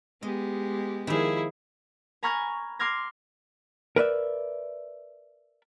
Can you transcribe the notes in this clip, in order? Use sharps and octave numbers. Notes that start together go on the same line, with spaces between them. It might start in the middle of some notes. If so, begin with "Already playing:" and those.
G#3 B3 G4 D#5
D#3 F3 E4 G#4
G#5 A#5 B5 C#6 F6 G#6
C6 D6 F6 G#6 A#6
A#4 B4 D5 E5